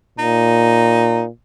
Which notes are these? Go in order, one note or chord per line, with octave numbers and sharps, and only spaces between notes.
A#2 D#4